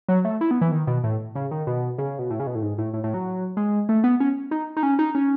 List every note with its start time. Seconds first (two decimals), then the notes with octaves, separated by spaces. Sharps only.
0.08 F#3
0.25 A3
0.41 E4
0.51 B3
0.61 E3
0.72 D#3
0.87 B2
1.04 A2
1.35 C#3
1.51 D#3
1.67 B2
1.98 C#3
2.19 B2
2.30 A2
2.40 C#3
2.47 B2
2.55 A2
2.62 G#2
2.78 A2
2.94 A2
3.04 A2
3.14 F#3
3.57 G#3
3.89 A3
4.04 B3
4.20 C#4
4.51 D#4
4.77 D#4
4.83 C#4
4.99 D#4
5.15 C#4